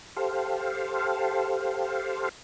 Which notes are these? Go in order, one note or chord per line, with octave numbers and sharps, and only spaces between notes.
G4 A4 C5 F5